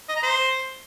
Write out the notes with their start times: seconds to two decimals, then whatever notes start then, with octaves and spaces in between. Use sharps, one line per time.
0.09 D#5
0.16 A#5
0.23 C5